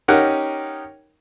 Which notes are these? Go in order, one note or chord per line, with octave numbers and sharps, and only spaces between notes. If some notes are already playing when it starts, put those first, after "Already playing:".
C#4 D#4 G4 A#4 F#5